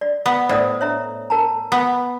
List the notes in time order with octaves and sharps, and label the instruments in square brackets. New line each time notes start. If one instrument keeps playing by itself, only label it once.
[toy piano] D5
[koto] B3
[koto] A2 [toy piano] C5 D5 D#6
[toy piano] C#5 E5 A#5
A#4 A5 A#5
[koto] B3